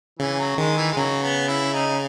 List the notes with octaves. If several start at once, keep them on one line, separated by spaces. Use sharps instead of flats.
C#3 E3
F#3
D#3 G#3
E3
G#3
C#3 F#3
B3
E4
D#4